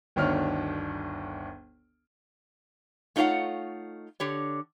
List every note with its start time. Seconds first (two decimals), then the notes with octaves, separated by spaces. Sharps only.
0.16 G1 D2 D#3 D4 C#5 F6
3.16 A3 D#4 F4 C#5 F5 F#5
4.20 D3 G4 C#5